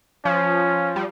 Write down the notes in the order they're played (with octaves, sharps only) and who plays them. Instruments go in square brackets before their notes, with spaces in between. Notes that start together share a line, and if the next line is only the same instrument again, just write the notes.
[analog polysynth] F3 [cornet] C#4
[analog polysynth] G3